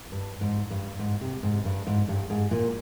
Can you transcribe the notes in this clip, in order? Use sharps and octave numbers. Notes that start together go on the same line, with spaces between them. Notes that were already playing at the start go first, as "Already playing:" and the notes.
G2
G#2
G2
G#2
C3
G#2
G2
G#2
G2
G#2
A#2